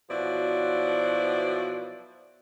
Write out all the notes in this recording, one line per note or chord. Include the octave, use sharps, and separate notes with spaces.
B2 F3 F#3 E4 D5